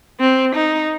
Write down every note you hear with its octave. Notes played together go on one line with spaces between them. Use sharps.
C4
D#4